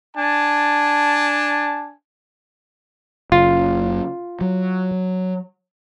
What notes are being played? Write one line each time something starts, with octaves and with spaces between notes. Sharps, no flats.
D4 G#5 A5
F#1 C#3 F4
F#3